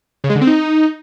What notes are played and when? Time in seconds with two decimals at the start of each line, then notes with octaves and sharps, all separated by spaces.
0.24 C#3
0.30 G#3
0.35 D3
0.41 C4
0.47 D#4